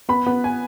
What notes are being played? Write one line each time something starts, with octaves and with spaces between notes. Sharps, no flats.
B3 B5
B3
G#5